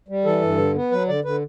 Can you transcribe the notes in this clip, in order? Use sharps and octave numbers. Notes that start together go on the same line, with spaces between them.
G3
E3 A4
G2
D3
B3
F#3 B4
D3 D5
D3 B4